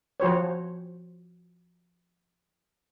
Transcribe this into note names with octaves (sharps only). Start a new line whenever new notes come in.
F3 F#4 C5 C#5